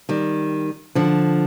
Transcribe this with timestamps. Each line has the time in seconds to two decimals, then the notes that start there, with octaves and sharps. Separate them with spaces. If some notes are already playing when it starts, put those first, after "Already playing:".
0.09 D#3 G3
0.95 D3 F3